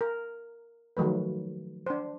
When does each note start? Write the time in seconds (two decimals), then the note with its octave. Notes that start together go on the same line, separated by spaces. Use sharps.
0.01 A#4
0.97 D#3 F3 F#3 A3 B4
1.86 D4 C5